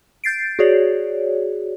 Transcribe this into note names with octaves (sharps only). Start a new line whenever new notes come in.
G6 A6 C7 D7
F#4 G#4 C#5 D5